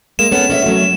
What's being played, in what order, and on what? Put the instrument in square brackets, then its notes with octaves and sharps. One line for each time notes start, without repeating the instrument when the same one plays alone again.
[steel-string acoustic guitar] G#3 A#3 [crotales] E7
[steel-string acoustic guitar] B3 C#4 A4
C#4 D5 E5
F#3 A3 F#4